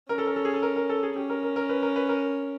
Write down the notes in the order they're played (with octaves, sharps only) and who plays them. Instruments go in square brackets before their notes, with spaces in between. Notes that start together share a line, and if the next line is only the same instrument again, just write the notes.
[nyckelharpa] C#4 [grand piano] A#4
[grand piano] A4
A#4
A4
G#4
A4
A#4
A#4
A4
G#4
[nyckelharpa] C#4 [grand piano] G4
[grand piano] A#4
A#4
A#4
B4
A#4
B4
A#4